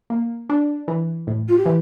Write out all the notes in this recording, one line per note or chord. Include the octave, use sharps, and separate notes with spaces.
A#3
D4
E3
A2
F4
G4
E3